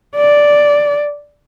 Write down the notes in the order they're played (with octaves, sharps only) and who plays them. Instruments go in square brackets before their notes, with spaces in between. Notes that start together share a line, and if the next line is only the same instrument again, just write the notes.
[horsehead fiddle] D5